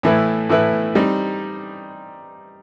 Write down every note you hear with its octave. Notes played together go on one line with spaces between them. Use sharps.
A2 E3 A3 E4 B4
A2 E3 A3 E4 B4
G3 C4 D#4